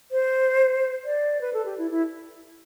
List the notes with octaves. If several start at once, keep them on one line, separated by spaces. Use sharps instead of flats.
C5
D5
B4
A4
G4
E4
E4